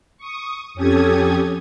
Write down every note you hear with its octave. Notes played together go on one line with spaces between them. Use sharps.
C#6 D#6
F2 C#4 G4 A4 D#6 G#6